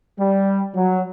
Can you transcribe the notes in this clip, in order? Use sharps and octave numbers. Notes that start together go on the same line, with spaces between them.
G3
F#3